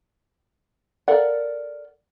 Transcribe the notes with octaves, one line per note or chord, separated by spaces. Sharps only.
A4 A#4 D5 F5 F#5